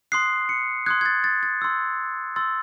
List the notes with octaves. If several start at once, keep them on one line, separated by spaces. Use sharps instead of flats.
C6 D#6 F#6 C7
C#7
C6 D#6 F#6 G#6
G#6
A6
A6
A6
C6 E6
C6 E6 A6